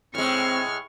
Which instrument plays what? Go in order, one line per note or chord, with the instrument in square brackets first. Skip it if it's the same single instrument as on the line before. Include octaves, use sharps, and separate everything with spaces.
[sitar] A2 G#3 [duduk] C4 [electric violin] C#6 F6